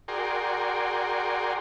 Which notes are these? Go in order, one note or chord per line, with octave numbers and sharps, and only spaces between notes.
F#4 G#4 A#4 D5 G5 C6